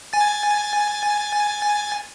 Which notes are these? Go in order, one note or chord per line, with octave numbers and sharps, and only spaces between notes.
G#5 A6